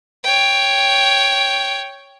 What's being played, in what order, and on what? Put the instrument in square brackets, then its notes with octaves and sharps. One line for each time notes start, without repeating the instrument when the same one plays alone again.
[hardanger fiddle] C#5 G5